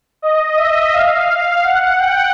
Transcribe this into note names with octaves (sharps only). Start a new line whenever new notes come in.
D#5
E5
F5
F5
F#5
G5